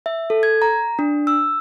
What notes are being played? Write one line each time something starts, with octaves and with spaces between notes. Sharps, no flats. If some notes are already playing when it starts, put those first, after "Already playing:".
E5
A4
G#6
A#5
D4
E6